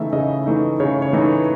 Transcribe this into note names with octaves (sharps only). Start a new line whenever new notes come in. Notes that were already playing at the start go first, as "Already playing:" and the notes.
Already playing: C#3 E3 A3 D#4 E5
C#3 D#5
E3 A3 D#4
C#3 C#5
C#5
E3 A3 D#4
B4